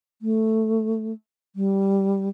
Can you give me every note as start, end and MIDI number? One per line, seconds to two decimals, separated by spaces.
0.22 1.13 57
1.56 2.29 55